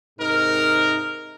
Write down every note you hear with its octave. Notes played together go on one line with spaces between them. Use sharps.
G#2 C3 D#4 A#4